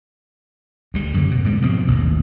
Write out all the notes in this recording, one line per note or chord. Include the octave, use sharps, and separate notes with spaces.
D2 G3
F#2 D3
B2
G#2 B2 G3
B2 F3 A#3 C4
A1 D#2 B2